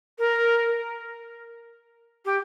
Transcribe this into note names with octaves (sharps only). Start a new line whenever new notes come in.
A#4
G4